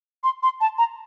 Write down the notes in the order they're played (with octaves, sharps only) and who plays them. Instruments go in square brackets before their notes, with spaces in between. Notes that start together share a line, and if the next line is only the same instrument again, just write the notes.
[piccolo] C6
C6
A5
A#5